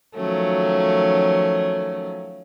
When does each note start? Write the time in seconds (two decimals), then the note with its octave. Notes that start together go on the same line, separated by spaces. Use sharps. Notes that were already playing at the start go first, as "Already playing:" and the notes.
0.14 D#3 F3 F#3 A3 C#4